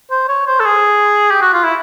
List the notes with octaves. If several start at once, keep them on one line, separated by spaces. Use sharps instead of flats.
C5
C#5
C5
A4
G#4
G4
F#4
F4
E4